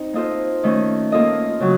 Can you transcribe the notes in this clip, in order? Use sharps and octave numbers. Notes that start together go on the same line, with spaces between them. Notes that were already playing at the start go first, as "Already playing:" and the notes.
Already playing: C4 D#4
A#3 F4 A4 C5 D#5
D#3 A3 C#4
A#3 F4 A4 D#5
C#3 F#3